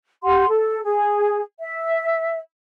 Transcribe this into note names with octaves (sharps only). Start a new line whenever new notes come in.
G4 F#5 C6
A4
G#4
E5